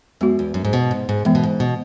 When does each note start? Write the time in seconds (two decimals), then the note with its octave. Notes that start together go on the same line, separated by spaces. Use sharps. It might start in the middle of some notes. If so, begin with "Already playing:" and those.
0.21 F#2 G#3 B3 F#4
0.39 E2
0.54 F#2
0.65 G#2
0.73 B2
0.91 G#2
1.09 G#2
1.25 F#2 E3 G#3 B3
1.35 B2
1.44 G#2
1.60 B2